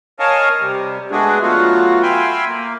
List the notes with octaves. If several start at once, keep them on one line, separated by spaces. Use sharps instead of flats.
A#4 C#5 D#5 F5 G#5 A5
C3 G3
G#3 A3 B3 D4 F#4 G#4
F#3 A3 B3 F4 F#4
E5 F5 G5 G#5 B5 C6
A#3